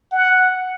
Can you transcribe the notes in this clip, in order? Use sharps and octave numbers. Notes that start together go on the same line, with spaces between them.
F#5